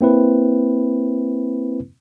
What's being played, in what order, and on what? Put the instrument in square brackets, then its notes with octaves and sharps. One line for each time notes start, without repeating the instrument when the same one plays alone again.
[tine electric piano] A#3 C4 E4 B4